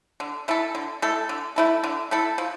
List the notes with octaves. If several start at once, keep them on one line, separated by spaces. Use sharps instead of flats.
D3
A3 E4 A4
D3
A3 E4 A4
D3
A3 E4 A4
D3
A3 E4 A4
F3